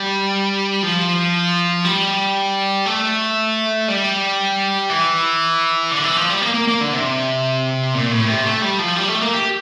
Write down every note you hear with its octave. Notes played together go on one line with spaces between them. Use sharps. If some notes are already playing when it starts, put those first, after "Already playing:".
Already playing: G3
F3
G3
A3
G3
E3
D3
E3
F3
G3
A#3
A#3
A#3
D3
C3
A#2
A2
C3
A3
G3
F3
G3
A3
A#3
G4